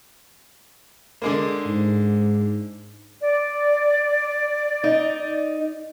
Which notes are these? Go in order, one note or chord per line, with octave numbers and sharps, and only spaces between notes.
D3 G#3 A#3
G#2
D5
D#4